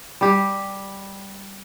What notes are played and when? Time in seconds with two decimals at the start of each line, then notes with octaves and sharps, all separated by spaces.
0.21 G3 G4